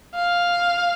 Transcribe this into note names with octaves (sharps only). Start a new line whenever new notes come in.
F5